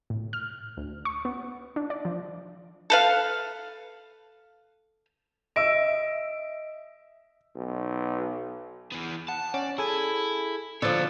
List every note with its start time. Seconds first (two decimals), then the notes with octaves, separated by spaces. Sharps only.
0.10 A2
0.33 F6
0.77 D2
1.05 C#6
1.25 B3
1.76 D4
1.90 D5
2.05 F3
2.90 A4 B4 F5
5.56 D#5 E5 E6 D7
7.56 B1
8.92 E3 B3
9.29 F#5 A5
9.54 C#4 D5
9.78 E4 G#4 A4 G#5
10.82 D3 F3 F4 C#5 E6 A6